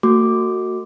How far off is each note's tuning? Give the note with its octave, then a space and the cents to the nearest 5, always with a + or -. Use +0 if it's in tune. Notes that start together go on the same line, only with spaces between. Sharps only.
A3 +45 F#4 +0 D6 +0